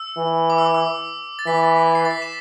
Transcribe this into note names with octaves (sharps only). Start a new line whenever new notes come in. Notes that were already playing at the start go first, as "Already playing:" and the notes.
Already playing: E6
E3
D6
E6
D6
E6
A6
E3 B6
A6
B6
C7
A6
B6
E7